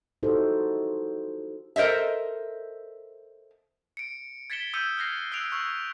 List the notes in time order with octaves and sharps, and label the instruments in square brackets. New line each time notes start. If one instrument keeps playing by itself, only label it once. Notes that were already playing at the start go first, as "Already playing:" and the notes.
[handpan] D#4 E4 F#4 G4 A4 C5
[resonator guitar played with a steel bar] A4 A#4 C5 D#5 E5
[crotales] C#7 D7
G#6 A6 B6 C#7 E7 G7
D#6 E6 G6 G#6 C#7 D#7
F6 F#6 G#6 A#6 C7
E6 F#6 C7 D7 F7
C#6 E6 G#6